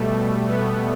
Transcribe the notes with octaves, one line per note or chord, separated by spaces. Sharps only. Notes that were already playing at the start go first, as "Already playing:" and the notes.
Already playing: B2 G3 A3
B3